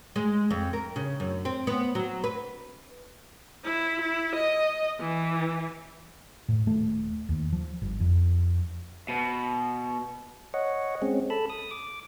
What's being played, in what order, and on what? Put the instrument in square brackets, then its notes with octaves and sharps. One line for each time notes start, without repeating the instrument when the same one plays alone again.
[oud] G#3
F2
A#4
C#3
F#2
C4
B3
F#3
B4
[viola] E4
E4
D#5
E3
[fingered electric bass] A2
D#1 A3
D#2
F3
G1
F2
[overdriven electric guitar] B2
[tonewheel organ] C#5 D#5 F#5
G#3 C4 C#4
A4 A5 B5
D#6
D6